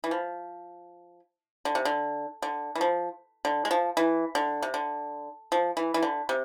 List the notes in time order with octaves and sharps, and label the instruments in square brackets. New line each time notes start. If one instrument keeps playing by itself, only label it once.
[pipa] E3
F3
D3
C3
D3
D3
E3
F3
D3
G#3
F3
E3
D3
C3
D3
F3
E3
E3
D3
C3